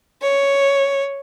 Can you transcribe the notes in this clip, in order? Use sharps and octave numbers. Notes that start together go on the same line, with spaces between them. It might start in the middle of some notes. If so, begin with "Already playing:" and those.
C#5